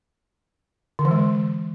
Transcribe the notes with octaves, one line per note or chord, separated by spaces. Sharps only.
D3
E3
G#3